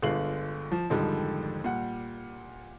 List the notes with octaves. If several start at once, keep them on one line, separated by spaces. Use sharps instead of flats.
G1 D3 G#3 F4 C7 F#7
F3
F2 G#2 D3 D#3 F3 G3
A#2 G3 F#5